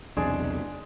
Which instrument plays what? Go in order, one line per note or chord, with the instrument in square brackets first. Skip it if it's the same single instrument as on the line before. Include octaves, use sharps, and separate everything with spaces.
[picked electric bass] B1 E2 C3 [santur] G#3 [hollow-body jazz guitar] D4